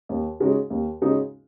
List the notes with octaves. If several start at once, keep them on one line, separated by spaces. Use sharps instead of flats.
D#2
C#3 G#3 D#4 F#4
D#2
C#3 G#3 D#4 F#4